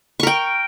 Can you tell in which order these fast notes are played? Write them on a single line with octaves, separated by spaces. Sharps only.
C#6 A#4 G5